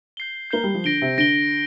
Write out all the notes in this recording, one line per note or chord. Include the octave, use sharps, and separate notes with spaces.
G6 C7 G7
A#3 G6 C7 G7
G3
F3
D3 A#6 D7 G7
C3
D3 A#6 D7 G7